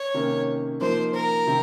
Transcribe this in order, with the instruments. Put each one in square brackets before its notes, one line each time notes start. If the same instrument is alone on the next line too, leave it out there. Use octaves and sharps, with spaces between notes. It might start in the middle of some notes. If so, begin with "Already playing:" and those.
Already playing: [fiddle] C#5
[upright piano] C3 D#3 A#3 C#4
[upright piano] F3 A#3 D#4 [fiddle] C5
[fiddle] A#4
[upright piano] C3 D#3